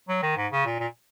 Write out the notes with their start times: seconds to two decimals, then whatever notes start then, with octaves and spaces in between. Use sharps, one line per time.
0.09 F#3
0.22 D#3
0.37 G#2
0.52 C#3
0.66 A#2
0.80 A#2